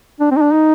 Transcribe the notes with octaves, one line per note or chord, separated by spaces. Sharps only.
D4
C4
D#4
D4
D#4